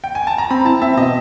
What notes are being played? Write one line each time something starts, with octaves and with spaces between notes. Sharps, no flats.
G5
G#5
A5
A#5
C4 B5
E4 A5
C4 E5
B2 D#5